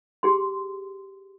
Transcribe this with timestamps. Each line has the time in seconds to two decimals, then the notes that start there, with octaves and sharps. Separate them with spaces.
0.23 G4 G#4 C6